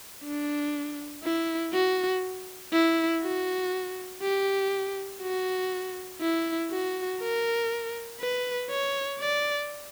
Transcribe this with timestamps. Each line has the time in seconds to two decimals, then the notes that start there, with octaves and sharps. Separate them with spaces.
0.24 D4
1.24 E4
1.73 F#4
2.73 E4
3.23 F#4
4.22 G4
5.22 F#4
6.21 E4
6.71 F#4
7.21 A#4
8.20 B4
8.70 C#5
9.20 D5